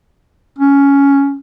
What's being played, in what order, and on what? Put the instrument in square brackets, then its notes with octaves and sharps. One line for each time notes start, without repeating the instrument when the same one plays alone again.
[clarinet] C#4